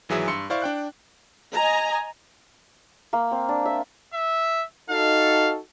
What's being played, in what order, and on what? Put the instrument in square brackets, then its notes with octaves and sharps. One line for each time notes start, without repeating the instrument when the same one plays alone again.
[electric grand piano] G#1 E3 F#3 G#4 E5 D#6
G2 C6 E6 C#7
E4 C5 D5 F5 C#6
D4 G5 F#6
[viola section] D#5 G#5 A#5
[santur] A#3
C4
D4
E5
[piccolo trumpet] E5
[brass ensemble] D#4 F#4 A4 [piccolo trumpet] F5